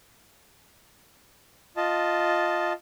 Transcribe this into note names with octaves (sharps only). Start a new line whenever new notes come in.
F4 D#5 A5